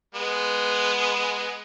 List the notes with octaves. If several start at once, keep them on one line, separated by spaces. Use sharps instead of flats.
G#3 B3